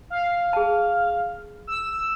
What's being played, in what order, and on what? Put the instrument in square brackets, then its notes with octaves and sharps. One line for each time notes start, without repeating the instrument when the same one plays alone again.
[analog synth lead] F5
[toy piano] G#4 A5
[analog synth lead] E6